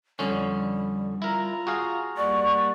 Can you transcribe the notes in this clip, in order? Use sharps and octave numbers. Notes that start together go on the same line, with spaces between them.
F2 D3 G3 C#4
E4 F4 A#4 A#5
F#4 G#4 F5
G3 A#3 D5 F#5 C#6